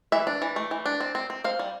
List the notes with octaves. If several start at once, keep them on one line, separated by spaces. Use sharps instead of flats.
E3 E5
D4
E3
A3
E3
D4
C4
C4
C4
C4 F5
G3